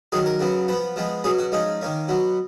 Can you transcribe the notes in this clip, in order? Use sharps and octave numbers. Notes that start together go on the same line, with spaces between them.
D#3 F#3 C#4 G#4
A#4
C#3 F#3 B3
F3 B3 B4
F3 G#3 B3
B2 F#3 C#4 G#4
F#4
F3 G#3 C#4 D#4
D#3 A#3 C#4
B2 F#3 B3